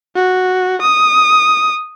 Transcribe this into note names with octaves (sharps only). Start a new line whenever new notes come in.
F#4
D#6